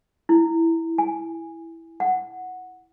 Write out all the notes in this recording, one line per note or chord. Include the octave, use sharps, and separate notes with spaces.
E4
G#5
F#5